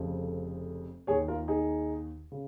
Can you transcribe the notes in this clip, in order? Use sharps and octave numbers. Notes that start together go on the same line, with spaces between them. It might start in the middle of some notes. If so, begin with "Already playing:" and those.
Already playing: F1 F2 C#3
D#2 D#3 G#4 C#5
F4 A#4
D#4 G#4
C#3